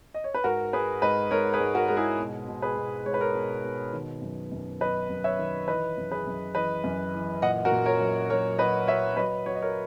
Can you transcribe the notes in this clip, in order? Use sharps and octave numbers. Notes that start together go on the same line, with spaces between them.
D#5
C#5
B4
G#2 F#4 A#4
G#3 G#4 B4
G#2 B4 D#5
G#2 A#4 C#5
G#4 B4
G#2
F#4 A#4
G#3 A#4
E4 G#4
B2
B2
G#4 B4
B2
G#3 C#5
B4
A#4 C#5
B2
B2
D#3
F#2
F#2
F#3 B4 D#5
F#2
C#5 E5
D#3
E3 B4 D#5
F#2
G#4 B4
F#2
E3 B4 D#5
F#2
E3
A#2 D#5 F#5
F#4 A#4
A#2
A#4 C#5
F#3
F#3 A#4 C#5
F#3 B4 D#5
F#3 C#5 E5
F#3 B4 D#5
F#3 C#5
D#5
A#4 C#5